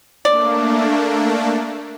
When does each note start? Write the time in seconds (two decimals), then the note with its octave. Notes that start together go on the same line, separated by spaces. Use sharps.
0.25 A3 A#3 D4 D5